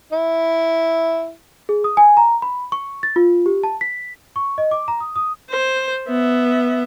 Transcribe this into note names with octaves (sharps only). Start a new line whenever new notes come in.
E4
G#4
D#6
G#5
A#5
B5
C#6
A6
F4
G4
A5
B6
C#6
D#5
D6
A#5
D#6
D#6
C5
B3 E5